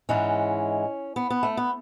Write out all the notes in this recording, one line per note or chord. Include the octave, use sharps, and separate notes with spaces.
G#2 E3 G#3 C#4
B3
B3
A3
B3